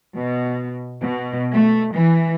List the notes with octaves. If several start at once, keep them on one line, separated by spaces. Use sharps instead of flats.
B2
B2
A3
E3